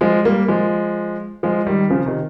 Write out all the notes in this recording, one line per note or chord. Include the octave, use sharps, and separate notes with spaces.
F3 G#3
G3 A#3
F3 G#3
F3 G#3
D#3 G3
C#3 F3
C3 D#3